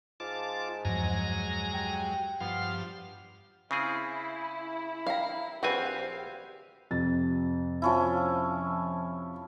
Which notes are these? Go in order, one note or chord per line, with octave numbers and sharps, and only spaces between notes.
G#2 F4 A5 D6
E2 G2 F3 F#3 G#3 G#5 A#5 A#6
G4
G2 F3 B3 C6 F6
C#3 C4 E4 G#4
F5 A#5
A#1 C4 F#4 G4 B4 C5 F5 G#5
F2 C3 A6
F3 C#4 E4